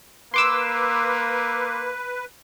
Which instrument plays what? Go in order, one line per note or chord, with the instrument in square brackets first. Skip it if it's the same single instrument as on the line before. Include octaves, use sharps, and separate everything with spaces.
[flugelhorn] A#3 [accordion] B4 [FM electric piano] C6 D6 E6